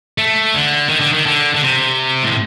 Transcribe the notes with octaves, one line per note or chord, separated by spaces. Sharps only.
A3
D3
D#3
D3
D#3
D3
D3
C3
A2